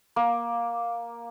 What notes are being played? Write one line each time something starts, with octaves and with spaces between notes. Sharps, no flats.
A#3